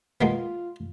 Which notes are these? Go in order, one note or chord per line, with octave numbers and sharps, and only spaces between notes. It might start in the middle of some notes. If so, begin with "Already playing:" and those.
G#3 A#3 B3 F4